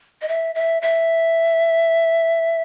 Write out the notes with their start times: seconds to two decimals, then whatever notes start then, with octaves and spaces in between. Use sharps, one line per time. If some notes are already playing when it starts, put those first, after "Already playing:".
0.22 D#5
0.29 E5
0.55 E5
0.82 E5